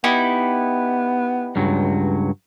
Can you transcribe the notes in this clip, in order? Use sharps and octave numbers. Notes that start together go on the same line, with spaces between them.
B3 D#4 E4 G4
C#2 G2 F#3